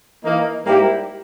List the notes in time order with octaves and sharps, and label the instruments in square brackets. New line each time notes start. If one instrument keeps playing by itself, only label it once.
[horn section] E3 A#3 D#4
G#2 G3 A#3 E4 G4